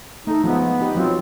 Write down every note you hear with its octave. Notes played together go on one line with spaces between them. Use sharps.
A3 D#4 A4
F3 G#3 B3 D#4
D#4 G4 B4
F3 F#3 C4 F4